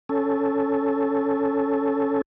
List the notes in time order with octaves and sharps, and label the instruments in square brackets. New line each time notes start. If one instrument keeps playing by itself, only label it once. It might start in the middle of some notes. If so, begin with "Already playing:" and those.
[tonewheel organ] C#4 A4